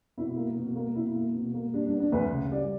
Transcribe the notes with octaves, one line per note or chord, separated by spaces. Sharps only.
B2 E4
A#3
B2
A#3
B2 E4
A#3
B2
A#3
G3 D4
D4
B3
D4
D2 B4
C#3
G3 D5